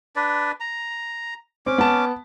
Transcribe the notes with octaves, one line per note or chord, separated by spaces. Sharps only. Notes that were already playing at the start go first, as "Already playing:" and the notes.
D4 B4 D5
A#5
C4 C#4 D6
B3 A5